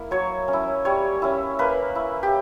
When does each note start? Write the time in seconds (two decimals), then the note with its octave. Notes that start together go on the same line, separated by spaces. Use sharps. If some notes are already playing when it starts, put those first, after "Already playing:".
Already playing: A#3 E4
0.11 F#3 C#5
0.48 C#4
0.53 E4
0.85 G3 C#5
1.22 C#4 E4
1.59 A#3 B4
1.95 E4
2.23 G4